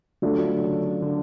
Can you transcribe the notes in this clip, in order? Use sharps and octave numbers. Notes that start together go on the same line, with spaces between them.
D3 F#3 A3 D4 F4 A4
C#3
D3